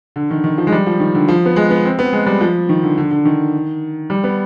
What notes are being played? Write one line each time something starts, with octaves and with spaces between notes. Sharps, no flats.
D3
D#3
D#3
F3
G#3
G3
F3
D#3
D3
F3
B3
G#3
B3
C4
B3
G#3
G3
F3
D#3
D3
D3
D3
D#3
G3
B3